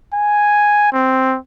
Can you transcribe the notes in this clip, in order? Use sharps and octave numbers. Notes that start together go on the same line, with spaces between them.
G#5
C4